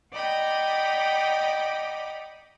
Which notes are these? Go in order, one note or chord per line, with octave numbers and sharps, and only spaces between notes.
D5 D#5 F#5 G5 A#5 B5